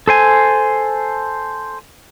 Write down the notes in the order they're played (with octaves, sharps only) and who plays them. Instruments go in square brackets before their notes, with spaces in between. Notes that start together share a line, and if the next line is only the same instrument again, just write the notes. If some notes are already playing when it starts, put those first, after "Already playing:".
[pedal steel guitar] A4 C5 G#5